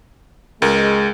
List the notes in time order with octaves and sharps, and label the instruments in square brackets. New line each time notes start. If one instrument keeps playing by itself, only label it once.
[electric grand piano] C#2 A#4 [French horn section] G#3